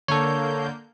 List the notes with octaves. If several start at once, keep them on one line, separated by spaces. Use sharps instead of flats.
D3 A#3 A4 C#5 G6